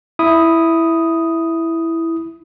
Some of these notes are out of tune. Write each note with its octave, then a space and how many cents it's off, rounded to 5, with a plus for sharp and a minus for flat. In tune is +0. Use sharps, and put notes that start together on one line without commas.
E4 +0 D#6 +0